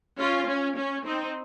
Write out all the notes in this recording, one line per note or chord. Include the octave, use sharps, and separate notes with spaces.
C#4 F4
C#4
C#4
C4 D#4